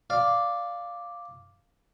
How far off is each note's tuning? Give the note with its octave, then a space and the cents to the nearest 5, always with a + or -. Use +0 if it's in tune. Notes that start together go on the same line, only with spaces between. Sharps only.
D5 +0 F5 +0